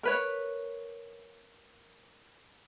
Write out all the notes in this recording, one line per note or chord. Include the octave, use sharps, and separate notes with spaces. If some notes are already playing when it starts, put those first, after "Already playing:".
A#4 B4 C#5